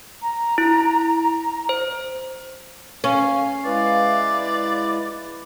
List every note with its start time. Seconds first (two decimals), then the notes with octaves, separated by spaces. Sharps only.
0.22 A#5
0.58 E4
1.69 C5
3.04 C#4 F5
3.65 G#3 E4 B4 D5